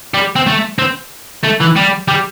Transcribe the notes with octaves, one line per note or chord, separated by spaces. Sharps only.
G3
C4
A3
C4
A3
E3
G3
G3